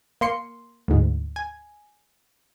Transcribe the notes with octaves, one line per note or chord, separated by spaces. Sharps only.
A#3 C6 C#7
D2 G#2
G#5